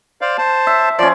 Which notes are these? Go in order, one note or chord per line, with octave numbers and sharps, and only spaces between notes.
C5 D5 F5
C5 A5
E5
F3 C#4 D5